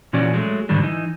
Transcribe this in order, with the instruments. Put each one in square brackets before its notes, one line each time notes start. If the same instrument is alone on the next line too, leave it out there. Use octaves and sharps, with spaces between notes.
[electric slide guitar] A#2 E3 C#4 F#4 D5
F#3 G#3 A3
G#2 D3 D#3 G3 D4
E3 D#4